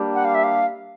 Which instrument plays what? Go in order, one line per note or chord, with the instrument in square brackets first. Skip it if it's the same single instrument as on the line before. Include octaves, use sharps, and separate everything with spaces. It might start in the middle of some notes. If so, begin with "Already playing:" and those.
Already playing: [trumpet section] G3 A#3 D4 G4
[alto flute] F#5
F5
E5
F5